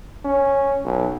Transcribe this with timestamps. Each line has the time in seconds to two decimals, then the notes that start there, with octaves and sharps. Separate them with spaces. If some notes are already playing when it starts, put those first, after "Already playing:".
0.25 C#4
0.85 B1